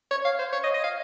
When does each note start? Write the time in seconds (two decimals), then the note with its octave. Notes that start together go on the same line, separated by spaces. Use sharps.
0.11 C#5
0.25 F5
0.39 C5
0.53 C#5
0.64 D#5
0.74 D#5
0.84 F5